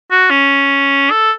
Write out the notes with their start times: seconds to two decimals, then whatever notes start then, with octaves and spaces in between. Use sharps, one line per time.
0.11 F#4
0.30 C#4
1.11 A4